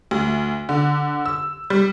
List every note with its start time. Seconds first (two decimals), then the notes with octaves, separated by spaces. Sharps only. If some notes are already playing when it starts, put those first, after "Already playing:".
0.11 D2
0.69 D3
1.26 E6
1.70 G3